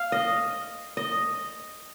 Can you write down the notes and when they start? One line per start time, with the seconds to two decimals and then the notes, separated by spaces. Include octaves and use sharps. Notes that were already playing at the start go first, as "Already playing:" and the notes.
Already playing: F5
0.12 D#5
0.97 D#5